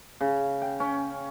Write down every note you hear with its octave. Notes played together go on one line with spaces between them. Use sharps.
C#3
G5
C#4